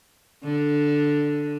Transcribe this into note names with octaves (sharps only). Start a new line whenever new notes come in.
D3